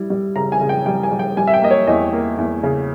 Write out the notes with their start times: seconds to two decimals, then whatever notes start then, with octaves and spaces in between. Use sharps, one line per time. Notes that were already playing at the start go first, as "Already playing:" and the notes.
Already playing: G3 E4
0.10 G3
0.36 C#3 A#5
0.52 G#5
0.61 C#3
0.69 G5
0.86 G3 G5
1.03 G#5
1.11 G3
1.19 G5
1.37 G3 G#5
1.47 E5
1.54 G5
1.62 A#3 D#5
1.71 C#5
1.87 E2 D#5
2.13 A#3
2.38 E2
2.63 C#3